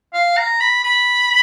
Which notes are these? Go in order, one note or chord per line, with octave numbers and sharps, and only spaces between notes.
F5
A#5
B5
B5